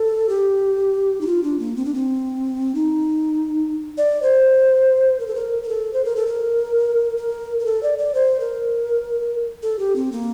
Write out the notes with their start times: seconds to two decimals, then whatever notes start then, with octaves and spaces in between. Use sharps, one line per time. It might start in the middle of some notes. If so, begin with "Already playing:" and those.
Already playing: A4
0.29 G4
1.21 D#4
1.27 F4
1.43 D4
1.59 A#3
1.76 C4
1.85 D4
1.94 C4
2.75 D#4
3.98 D5
4.22 C5
5.20 A#4
5.27 A4
5.35 A#4
5.63 A#4
5.69 A4
5.93 C5
6.05 A#4
6.16 A4
6.27 A#4
7.17 A#4
7.59 A#4
7.65 A4
7.83 D5
7.98 D5
8.14 C5
8.40 A#4
9.63 A4
9.79 G4
9.96 C4
10.12 A#3